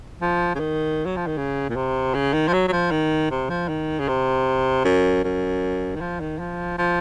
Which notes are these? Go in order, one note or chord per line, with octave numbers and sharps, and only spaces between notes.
F3
C#3
D#3
F#3
F3
D#3
C#3
A#2
C3
C#3
D#3
F3
F#3
F#3
F3
D#3
C3
F3
D#3
C#3
C3
F#2
F#2
D#3
F3
D#3
F3
F3